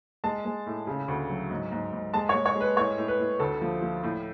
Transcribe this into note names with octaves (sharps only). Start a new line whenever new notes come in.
G#3 A5
G#3
A2
C#3
D2
F#3
G#2
G#2
G#2
G#3 A5
C#5
G#3
C#5
G#3
B4
A2 C#5
A2
B4
A2
D2 A4
F3
F3
A2